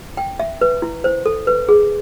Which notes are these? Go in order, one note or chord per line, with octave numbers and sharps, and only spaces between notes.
G5
E5
B4
E4
C5
A4
B4
G#4